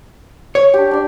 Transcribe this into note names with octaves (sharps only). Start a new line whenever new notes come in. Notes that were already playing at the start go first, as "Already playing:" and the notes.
C#5
D4 G4
D4 D5